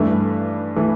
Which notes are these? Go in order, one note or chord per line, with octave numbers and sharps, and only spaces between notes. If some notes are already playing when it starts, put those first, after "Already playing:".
Already playing: G2 E3 A3
E3 A3